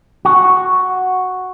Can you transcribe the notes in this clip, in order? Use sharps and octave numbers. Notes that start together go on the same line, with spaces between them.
F#4